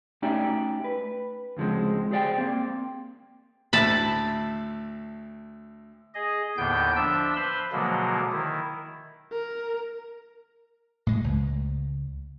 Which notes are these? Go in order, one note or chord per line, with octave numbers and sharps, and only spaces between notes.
A3 C#4 D#4 G4 D5 E5
B4
D2 C#3 F3 G#3 C4
G4 G#4 C5 D5 F#5 G5
A#3 C4
D2 A2 A5 B5
G#4 D#5
D#2 A2 D3 B3 G5 G6
F3 D4 E5 E6
B4 C5 B5 C6
B2 D3 F3 F#3 G#3 A#3
D#3 E4
A#4
A2 G#3
C#2